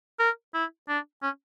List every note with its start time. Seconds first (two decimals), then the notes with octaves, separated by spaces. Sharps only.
0.20 A#4
0.54 E4
0.88 D4
1.22 C#4